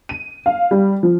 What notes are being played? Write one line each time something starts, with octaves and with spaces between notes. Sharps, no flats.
D#7
F5
G3
F3